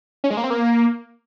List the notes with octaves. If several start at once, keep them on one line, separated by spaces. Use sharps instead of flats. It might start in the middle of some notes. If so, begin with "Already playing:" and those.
C#4
G#3
A#3
C4
A#3